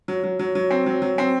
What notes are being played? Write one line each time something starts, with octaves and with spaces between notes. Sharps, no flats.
F#3
F#3
F#3
F#3
C4
F#3
F#3
C4